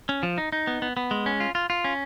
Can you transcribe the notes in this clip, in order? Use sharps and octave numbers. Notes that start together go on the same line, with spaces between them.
C#4
F3
D#4
D#4
B3
B3
B3
G#3
C#4
F4
F4
F4
C#4